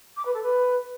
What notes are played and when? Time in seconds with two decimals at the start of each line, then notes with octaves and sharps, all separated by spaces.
0.16 D6
0.25 B4
0.34 A4
0.42 B4